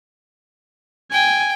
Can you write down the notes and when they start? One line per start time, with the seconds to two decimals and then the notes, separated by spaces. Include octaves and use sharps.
1.12 G5 G#5